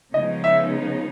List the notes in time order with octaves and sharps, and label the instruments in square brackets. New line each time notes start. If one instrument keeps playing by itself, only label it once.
[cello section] C#3 F3 G#3 B3 D#4 [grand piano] D#5
[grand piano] E5